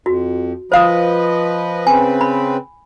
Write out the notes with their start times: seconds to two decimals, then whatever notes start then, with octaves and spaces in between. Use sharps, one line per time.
0.06 F2 F#4
0.72 F3 B4 C5 D#5 F5 D#6
1.87 C#3 C4 B4 G#5
2.21 B5